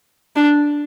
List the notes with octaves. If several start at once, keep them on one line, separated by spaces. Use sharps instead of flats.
D4